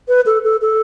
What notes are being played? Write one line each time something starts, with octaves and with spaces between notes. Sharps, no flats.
B4
A4
A4
A4